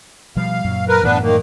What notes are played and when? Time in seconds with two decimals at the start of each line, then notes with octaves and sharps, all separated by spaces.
0.36 B2 F3 G3 F5
0.65 F#2 A#2 F#3
0.88 A#4 B4
1.03 F#2 A2 E3 B3 D4 B4
1.22 D#3 A#3